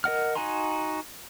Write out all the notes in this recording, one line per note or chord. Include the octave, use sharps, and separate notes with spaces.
A#4 D#5 F#5 F6
D#4 F#4 G#5 A#5 C6